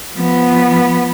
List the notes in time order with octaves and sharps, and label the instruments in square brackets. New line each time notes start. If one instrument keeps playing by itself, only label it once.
[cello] F3 B3